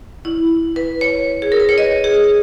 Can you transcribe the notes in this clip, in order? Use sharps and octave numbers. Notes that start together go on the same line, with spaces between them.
E4
B4
C#5
G#4
A#4
B4
C#5
D#5
G#4